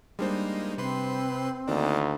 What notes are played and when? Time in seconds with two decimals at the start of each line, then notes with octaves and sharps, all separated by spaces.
0.19 G3 G#3 A#3 D4 D#4 C5
0.78 C3 C4 B4 C6
1.68 D2 D#3 A#3 D4 D#4